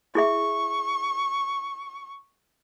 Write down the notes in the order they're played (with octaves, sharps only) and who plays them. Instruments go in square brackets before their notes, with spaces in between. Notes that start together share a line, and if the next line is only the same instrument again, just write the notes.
[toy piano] E4 G#4 E5 [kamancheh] C#6